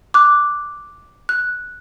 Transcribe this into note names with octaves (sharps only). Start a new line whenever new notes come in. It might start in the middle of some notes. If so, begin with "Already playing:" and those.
D6 F#6
F#6